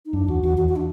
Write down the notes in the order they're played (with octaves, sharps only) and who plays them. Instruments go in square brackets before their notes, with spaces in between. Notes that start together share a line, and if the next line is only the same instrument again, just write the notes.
[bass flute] D#4
[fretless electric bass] F#2 [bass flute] D4
[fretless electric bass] E2 [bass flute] F#4
[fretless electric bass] E2 [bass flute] F#4
[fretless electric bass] E2 [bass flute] F#4
[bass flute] F#4
D4